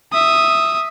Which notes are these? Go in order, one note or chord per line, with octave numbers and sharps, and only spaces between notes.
E5 D#6